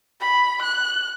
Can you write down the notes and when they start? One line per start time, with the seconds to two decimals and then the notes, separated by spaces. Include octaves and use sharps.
0.21 B5
0.63 F#6